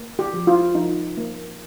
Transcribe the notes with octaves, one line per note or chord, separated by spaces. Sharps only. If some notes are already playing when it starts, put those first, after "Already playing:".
Already playing: A#3
G4
F3
F4
F3 D#4
A#3